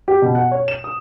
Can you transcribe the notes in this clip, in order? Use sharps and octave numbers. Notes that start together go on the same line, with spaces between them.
G4
B2
F#5
C#5
E7
D#6